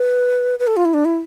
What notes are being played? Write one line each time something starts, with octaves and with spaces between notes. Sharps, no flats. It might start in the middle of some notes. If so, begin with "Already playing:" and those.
Already playing: B4
B4
A4
F4
E4
D4
E4